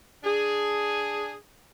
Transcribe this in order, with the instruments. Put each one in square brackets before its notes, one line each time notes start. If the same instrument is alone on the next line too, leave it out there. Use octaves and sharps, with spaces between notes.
[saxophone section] D4 G#4